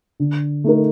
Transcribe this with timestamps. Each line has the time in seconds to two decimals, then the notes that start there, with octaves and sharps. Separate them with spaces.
0.20 D3
0.64 A3 D#4 A#4